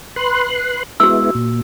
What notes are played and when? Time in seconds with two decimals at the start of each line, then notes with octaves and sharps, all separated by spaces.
0.16 B4 C6 F#6
1.00 G#3 B3 E4 F#4 E6
1.35 A#2